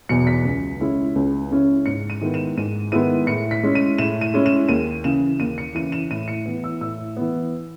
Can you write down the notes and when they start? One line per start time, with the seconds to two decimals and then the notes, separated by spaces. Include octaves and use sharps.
0.09 E2 B2 F#3 C#7
0.27 B6
0.45 C#2
0.80 C#3 G#3 C#4 E4
1.16 C#2
1.51 C#3 G#3 C#4 E4
1.86 G#2 C#7
2.10 D#7
2.21 D#3 G#3 B3 E4
2.34 E7
2.57 G#2 D#7
2.92 D#3 G#3 B3 E4 D#7
3.27 A2 C#7
3.51 B6
3.63 G#3 C#4 E4
3.75 D#7
3.98 A2 E7
4.21 D#7
4.34 G#3 C#4 E4
4.46 E7
4.69 D#2 D#7
5.04 C#3 E3 E7
5.40 D#2 D#7
5.58 C#7
5.75 C#3 E3 D#7
5.92 E7
6.11 A2 D#7
6.28 C#7
6.46 E3 B3
6.64 E6
6.81 A2 E6
7.17 E3 B3